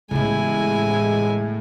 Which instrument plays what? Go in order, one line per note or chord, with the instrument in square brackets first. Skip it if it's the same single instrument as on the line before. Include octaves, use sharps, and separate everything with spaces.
[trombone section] A1 G#3 [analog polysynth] A2 [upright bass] C#3 B3 [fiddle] E4 G#5